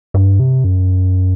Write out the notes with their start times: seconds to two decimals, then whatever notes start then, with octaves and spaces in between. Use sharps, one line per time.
0.14 G2
0.40 C3
0.64 F#2